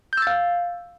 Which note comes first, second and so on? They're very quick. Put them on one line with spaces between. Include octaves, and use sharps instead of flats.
G6 E6 A6 F5